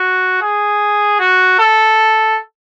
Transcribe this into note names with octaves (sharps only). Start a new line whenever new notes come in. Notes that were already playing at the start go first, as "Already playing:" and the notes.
Already playing: F#4
G#4
F#4
A4